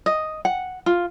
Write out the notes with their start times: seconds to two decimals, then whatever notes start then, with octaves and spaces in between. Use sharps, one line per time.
0.06 D#5
0.45 F#5
0.86 F4